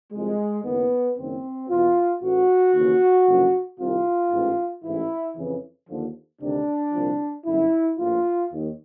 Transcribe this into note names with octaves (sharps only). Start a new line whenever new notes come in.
C2 C3 F3 G#3
F#1 F#2 D#3 B3
F#1 F#2 D#3 C4
E2 B2 F4
A1 A2 E3 F#4
D#2 C#3 E3
F#1 F#2 D3 F3
C2 C3 D#3 F4
A1 G#2 E3
A1 G#2 E3 E4
F2 C#3 E3
D#2 D3 F3
D2 C3 D#3 D4
C2 A#2 F3
G1 F#2 D3 E4
A#1 A2 F3 F4
D#2 D#3